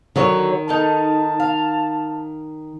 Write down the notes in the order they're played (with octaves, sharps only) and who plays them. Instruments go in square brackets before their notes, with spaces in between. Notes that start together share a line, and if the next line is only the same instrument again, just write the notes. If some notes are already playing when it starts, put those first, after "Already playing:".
[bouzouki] D3 F#3 C#5 [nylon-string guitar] D#3
[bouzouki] D#4 A4 A#4 [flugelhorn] A5
[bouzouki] F5